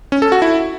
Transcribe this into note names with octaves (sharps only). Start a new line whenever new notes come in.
C#4
A4
F#4
E4